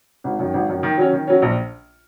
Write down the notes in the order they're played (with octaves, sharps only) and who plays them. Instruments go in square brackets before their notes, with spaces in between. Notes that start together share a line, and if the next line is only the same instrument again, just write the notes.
[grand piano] G#1
F#2 D#3
G#1
F#2 D#3
D#3
F#3 C#4
D#3
F#3 C#4
A#1